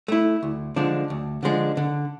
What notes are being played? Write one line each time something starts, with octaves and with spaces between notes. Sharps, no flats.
A3 E4
D2
D3 F3 G#3 D4
D2
D3 F3 G#3 D4
D3